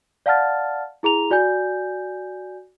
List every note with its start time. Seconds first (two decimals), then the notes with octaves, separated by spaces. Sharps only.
0.26 D5 F5 F#5 A5 F6 A6
1.03 E4 G#4 A#5 F7
1.31 F#4 D5 G#5 G6